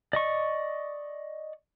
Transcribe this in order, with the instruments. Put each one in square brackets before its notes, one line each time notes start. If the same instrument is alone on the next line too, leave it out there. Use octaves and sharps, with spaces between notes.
[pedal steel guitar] D5 D#5 C#6